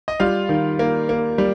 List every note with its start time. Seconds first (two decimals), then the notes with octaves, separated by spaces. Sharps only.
0.08 D#5
0.20 G3 F4 F5
0.49 D#3
0.79 A#3
1.09 A#3
1.38 G3